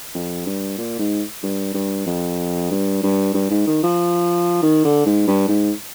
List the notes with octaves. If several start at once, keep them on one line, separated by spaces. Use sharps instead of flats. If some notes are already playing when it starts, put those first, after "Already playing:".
F2
G2
A#2
G#2
G2
G2
F2
G2
G2
G2
G#2
D#3
F3
D#3
D3
G#2
G2
G#2